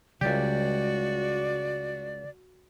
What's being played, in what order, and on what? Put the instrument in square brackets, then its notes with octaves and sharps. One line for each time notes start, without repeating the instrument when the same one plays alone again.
[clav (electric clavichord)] C#2 G4 [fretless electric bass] C#3 G3 G#3 [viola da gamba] F#4 [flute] D5